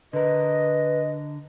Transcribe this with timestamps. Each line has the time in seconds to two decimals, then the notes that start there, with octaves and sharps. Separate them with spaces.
0.13 D3 A#4 B4 D#5